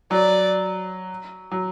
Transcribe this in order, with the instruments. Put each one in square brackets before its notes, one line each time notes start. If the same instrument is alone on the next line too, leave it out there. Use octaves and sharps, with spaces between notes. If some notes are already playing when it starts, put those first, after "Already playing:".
[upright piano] F#3 [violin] D5
[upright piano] F#3